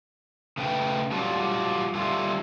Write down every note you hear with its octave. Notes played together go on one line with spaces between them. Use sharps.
C#3 A3 B4 G5
F#3 G3 D4 F4
D3 G3 E4 F4